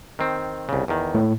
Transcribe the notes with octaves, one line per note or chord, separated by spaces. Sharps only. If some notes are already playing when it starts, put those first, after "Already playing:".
D#3 C4
C2 C#3
E2 D#3
A2